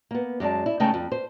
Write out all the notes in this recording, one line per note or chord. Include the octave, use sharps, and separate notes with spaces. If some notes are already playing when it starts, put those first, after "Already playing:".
A#3 B3
F#2 G#3 D5 A5
E4
C#3 G#3 A3 D#4 G5 A5
F2
C5